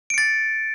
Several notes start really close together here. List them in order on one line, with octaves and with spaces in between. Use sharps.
D7 C#7 A6